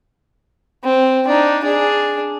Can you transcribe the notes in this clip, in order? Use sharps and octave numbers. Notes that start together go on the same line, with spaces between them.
C4
D4 D#4
D4 G#4